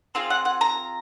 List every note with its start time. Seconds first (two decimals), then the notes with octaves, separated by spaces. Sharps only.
0.15 C4 F4 G#4 F5
0.30 F#5
0.45 F#5
0.61 A#5